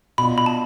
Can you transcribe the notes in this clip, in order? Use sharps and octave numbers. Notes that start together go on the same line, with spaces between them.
B2 B3 D4 F4 B5
B5
A5